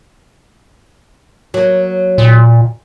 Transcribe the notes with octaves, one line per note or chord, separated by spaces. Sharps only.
F#3 A#3
A#2